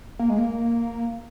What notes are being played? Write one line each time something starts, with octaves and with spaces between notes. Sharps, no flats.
A#3
G#3
A#3